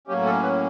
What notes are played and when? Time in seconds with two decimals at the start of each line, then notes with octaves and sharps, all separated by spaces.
0.08 A2 F#3 A#3 C#4 G4
0.25 A4
0.43 B4